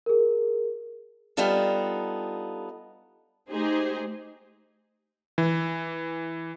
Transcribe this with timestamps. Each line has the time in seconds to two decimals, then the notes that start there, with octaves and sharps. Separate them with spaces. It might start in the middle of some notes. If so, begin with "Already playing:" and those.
0.06 G#4 A#4
1.37 G3 B3 D4 D#4 F4 A4
3.50 A3 D#4 G4 G#4 C5
5.38 E3